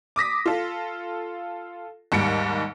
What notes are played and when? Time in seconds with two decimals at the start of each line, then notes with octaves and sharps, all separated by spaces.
0.16 D6 D#6 A#6 B6
0.46 F4 A4
2.12 D#2 G#2 G3 C#7 D7